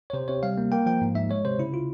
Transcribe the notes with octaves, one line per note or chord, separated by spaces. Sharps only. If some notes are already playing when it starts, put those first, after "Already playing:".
C#5
C3 C5
C3 C#5
G3 F5
A#3
A#3 G5
F3 G5
G#2
G#2 E5
G#3 C#5
C3 C5
C#3 E4
F4